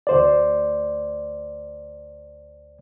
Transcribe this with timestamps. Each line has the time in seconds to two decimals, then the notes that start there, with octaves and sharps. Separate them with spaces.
0.07 D2 C5 D5